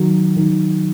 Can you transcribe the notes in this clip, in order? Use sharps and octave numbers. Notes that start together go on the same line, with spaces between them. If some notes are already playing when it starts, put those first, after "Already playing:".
Already playing: D#3 F#3
D#3